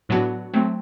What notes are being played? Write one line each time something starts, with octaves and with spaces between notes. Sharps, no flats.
A2 F#3 B3 D4 F#4
F#3 A3 C4